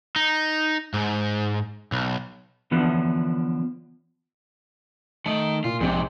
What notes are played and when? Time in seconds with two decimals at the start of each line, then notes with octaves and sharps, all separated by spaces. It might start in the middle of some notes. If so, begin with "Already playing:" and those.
0.16 D#4
0.94 G#2
1.92 B1
2.71 D3 E3 F3 B3 D4
5.26 D#3 A3 D#5
5.64 A#2 F4
5.81 A#1 G#2 C3 C4 G5